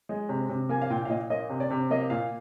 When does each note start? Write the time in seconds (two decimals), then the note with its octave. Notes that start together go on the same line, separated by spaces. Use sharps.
0.09 G#3
0.29 C3
0.49 C3
0.69 A#3 G#5
0.82 F5
0.90 A#2 G5
1.05 F5
1.09 A#2 D#5
1.30 A#3 D#5
1.50 C3
1.60 D5
1.71 C3
1.90 A#3 D#5
2.10 A#2 F5